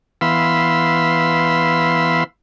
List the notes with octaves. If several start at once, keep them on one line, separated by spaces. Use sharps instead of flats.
E3 B3 F5 B5 C6 E6